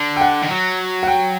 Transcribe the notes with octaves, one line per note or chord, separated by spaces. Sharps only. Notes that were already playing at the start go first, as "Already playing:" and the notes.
Already playing: D3
G5
F#5
D#3
F#3
F#5
G5